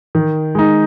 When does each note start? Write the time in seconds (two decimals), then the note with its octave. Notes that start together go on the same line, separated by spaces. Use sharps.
0.15 D#3
0.55 G#3 D#4